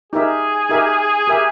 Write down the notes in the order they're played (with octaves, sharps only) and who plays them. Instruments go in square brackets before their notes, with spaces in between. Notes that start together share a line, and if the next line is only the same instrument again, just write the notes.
[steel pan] D#4 G4 A#4 E5 [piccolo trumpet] G#4
[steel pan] D#4 G4 A#4 E5
G4 A#4 E5